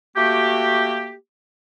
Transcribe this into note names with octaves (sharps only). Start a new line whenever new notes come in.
A3 A#3 F#4 G4